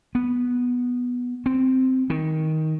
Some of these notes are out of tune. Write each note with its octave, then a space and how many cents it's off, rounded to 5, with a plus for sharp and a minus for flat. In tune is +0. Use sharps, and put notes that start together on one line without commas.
B3 -5
C4 -10
D#3 +15